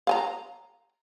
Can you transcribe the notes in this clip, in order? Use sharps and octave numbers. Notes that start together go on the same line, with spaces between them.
F5 G#5 A#5